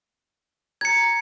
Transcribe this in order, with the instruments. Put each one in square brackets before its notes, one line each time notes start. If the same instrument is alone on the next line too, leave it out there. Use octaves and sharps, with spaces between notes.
[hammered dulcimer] A#5 [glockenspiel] G#6 C#7